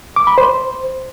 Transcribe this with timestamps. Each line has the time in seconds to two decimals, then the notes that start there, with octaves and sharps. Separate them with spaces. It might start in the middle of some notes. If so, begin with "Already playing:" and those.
0.16 D6
0.27 B5
0.38 C5